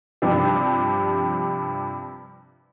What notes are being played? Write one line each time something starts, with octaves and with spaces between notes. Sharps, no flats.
G2 C3 F3 D4 G4